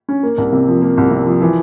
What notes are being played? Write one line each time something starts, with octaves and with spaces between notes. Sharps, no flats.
C#4
A#3
C2
C3
F3
A#3
C2
C3
F3
E3